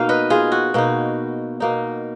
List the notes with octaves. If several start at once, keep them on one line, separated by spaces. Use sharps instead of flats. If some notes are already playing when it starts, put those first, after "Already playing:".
Already playing: B2 A#3 D#4 F5
B4 D#5
F4 G#4
F#4
B2 A#3 D#4
B2 A#3 D#4